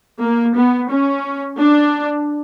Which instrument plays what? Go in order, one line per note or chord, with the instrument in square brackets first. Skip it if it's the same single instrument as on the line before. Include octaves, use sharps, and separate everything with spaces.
[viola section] A#3
B3
C#4
D4